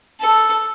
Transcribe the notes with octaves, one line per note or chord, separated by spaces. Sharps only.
A4